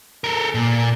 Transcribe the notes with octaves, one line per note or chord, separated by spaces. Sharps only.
A4 A#4
A#2